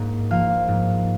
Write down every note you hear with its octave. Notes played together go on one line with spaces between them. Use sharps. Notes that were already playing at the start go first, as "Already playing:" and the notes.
Already playing: G#2 A#3
F3 A#3 F5
G#2